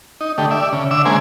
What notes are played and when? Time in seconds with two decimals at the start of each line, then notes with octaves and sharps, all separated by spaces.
0.21 D#4
0.38 D3 A3 G4
0.51 D5 E5
0.72 C#3
0.91 D3 E5 D6 E6
1.05 C#3 G#3 A#3 C5 G#5 D6